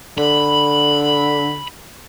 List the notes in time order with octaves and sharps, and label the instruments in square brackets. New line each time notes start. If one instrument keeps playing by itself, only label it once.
[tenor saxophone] D3 [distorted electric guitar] B5